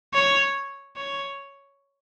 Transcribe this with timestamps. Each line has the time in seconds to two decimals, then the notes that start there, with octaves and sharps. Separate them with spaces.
0.14 C#5
0.97 C#5